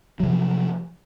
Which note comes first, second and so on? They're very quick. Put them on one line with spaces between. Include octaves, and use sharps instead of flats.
F#3 C3 F3